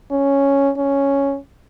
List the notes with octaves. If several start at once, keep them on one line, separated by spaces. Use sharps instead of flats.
C#4
C#4